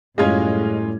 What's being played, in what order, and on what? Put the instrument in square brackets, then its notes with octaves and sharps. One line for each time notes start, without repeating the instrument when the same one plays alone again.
[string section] F#2 G3 [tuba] A2 [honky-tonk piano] G#3 G#6 [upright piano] C#4 F4 D#5